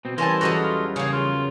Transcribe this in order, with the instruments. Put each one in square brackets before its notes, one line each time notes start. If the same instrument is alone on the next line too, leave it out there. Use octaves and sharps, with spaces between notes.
[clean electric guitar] B2 C4
[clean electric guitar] E3 G3 [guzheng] B3 C#4 [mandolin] A#4 G#5 A5 [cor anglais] C5
[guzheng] E2 F#3 C#4 [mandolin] F#4 A4 D#5
[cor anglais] F4
[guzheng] C#3 A#3 [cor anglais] G#4 [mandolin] C#5
[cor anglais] F4